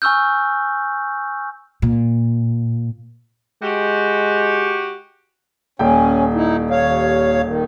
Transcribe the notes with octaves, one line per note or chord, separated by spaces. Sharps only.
G#5 C#6 E6 F6 G6
A#2
G#3 F#4 G4
D#1 C#4 G5
D#4 E4
D#2 C#5 F5
D#3